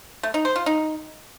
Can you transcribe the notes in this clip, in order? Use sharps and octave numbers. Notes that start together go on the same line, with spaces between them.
A3
D#4
C5
F4
D#4